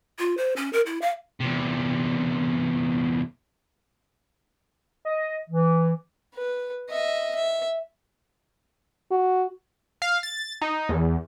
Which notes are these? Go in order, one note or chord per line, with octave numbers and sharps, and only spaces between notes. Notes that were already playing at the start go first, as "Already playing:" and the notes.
F4
C5
C#4
A#4
E4
F5
E2 C3
D#5
E3
B4
D#5 E5
E5
F#4
F5
A6
D#4
E2